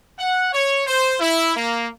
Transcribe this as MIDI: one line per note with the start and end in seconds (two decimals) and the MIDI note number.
0.19 0.48 78
0.53 0.85 73
0.87 1.15 72
1.20 1.53 64
1.56 1.88 58